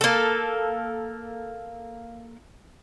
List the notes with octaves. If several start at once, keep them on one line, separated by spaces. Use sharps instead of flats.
A#3 A4